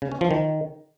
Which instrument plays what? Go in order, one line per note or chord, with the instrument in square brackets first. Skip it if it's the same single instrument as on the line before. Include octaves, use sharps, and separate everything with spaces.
[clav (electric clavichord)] C#3
C#4
F3
D#3